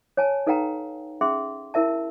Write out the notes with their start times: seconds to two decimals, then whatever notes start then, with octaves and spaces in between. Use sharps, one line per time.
0.17 C#5 G#5 A5
0.47 D#4 A4 B4 F5 G5 A#5
1.21 C#4 G#4 E5 C6
1.74 E4 A#4 E5 A5